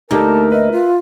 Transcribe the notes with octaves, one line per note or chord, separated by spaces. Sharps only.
D2 A#3 D#4 G4 A4 A#4 A5
B4 D#5 E5
F4